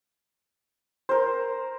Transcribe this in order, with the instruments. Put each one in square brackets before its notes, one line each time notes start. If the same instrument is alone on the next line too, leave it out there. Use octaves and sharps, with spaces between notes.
[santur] A#4 C5